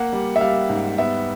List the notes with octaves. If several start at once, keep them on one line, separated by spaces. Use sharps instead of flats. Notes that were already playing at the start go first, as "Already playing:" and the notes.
Already playing: A#3 F#5
G3
E5
G3 F5
G#2
B3 E5